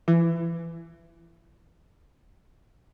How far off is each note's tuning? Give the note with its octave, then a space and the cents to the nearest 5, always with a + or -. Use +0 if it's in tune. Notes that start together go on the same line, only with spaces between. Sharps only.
E3 +25